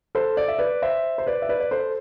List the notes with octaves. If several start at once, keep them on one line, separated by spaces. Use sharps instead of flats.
A4 C5
D5
E5
B4 D5
C5 E5
C5
B4 D5
E5
B4 D5
D5
A4 C5